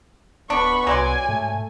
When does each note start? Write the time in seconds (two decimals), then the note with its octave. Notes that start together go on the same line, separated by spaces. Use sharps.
0.50 D1 B3 D4 B5 C#6
0.87 C2 F#3 D5 G#5 C6
1.28 G#2 A3